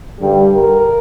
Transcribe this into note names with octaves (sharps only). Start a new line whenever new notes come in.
G2 D3 G3 G4
A#4